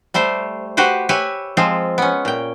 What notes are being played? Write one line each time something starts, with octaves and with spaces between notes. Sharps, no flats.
G3 A3 G4 C5
F#4 G4 B4 C5
G4 B4 C#5 E5 G#5
F3 G#3 C4 F4
B3 C#4
A#2 G5